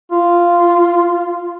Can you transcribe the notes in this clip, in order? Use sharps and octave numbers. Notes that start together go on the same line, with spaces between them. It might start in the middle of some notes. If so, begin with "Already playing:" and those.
F4